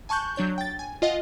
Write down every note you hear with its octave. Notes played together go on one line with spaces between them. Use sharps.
G#5 A5 C#6 F#6 G6
F#3 D4 C#5 G6
G5 A6
G#5
F4 D#5 F5 F#5